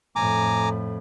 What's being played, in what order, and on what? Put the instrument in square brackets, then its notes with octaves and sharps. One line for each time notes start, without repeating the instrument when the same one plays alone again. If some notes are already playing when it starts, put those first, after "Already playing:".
[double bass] F2 A2 [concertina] G#5 A#5 D6